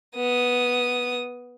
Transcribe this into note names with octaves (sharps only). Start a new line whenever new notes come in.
B3 D#6